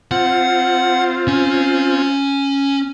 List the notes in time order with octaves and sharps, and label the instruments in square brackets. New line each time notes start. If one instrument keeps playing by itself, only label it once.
[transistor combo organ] C4 F4 [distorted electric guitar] F#5
[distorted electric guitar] C#4